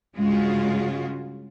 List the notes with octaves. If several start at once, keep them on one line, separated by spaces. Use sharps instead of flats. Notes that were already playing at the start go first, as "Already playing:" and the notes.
G2 C#3 G#3 F4 F#4 G#4